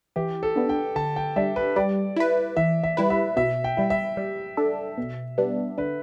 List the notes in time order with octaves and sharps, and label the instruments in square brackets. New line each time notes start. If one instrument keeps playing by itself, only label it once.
[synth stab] E3 [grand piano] G4
[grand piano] A4
[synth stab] B3 D4
[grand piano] G5
[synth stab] D3 [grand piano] A5
[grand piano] G5
[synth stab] G3 D4 [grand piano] E5
[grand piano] B4
[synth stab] G3 [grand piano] D5
[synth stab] E4 B4
[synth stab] E3 [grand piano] E5
[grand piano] E5
[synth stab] G3 E4 B4
[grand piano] E5
[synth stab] B2 [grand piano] E5
[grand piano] G5
[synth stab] G3 E4
[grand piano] E5
[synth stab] G3
D4 A4
B2
G3 B3 D4
[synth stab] D3 [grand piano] B4